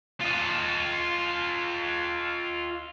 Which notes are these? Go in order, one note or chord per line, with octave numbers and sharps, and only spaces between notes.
F4 D#5